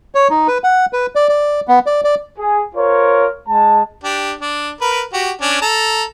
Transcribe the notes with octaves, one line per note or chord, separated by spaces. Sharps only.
C#5
D#4
B4
F#5
B4
D5
D5
B3
D5
D5
G#4
F4 A#4 C5 C#5
G#3 A5
D4 G4
D4
A#4 B4
F#4 G4
C#4 D4
A4 A#5